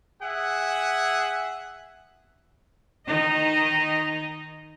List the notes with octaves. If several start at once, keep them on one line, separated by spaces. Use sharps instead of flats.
G#4 E5 F#5
D#3 D#4 D#5